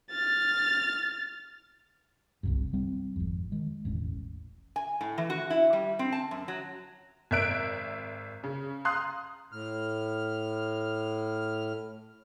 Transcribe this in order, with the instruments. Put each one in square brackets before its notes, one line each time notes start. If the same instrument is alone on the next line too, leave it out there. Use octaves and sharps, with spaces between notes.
[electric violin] F6 A6
[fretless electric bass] F#1 C2 G2
G3 C4
G#1 F2
D#3 G#3
E1 A1 C#4
[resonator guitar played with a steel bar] G#5
A2
E3
F#4
E4
G3
C4
A5
F#2
F#3
[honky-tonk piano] G#1 A#4 E5 F#6 D7
C#3
F5 A#5 C6 D#6 F#6
[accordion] A2 F6